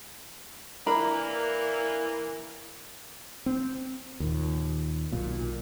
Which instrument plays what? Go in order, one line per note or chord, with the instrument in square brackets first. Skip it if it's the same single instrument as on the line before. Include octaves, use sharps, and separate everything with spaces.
[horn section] E3 A#3 [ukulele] D4 A#4 B5
[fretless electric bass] C4
D#2 A#2
B1 A#2